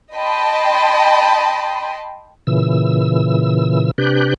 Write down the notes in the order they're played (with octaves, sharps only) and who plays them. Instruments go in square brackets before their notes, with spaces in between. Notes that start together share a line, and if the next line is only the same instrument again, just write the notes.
[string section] D#5 G5 A5 B5 C6
[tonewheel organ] A#2 C#3 E3 E6
C3 D4 G4 B4 F#6 G6